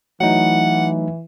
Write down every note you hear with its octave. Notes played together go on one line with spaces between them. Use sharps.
E3 F#3 A3 D#4 F#5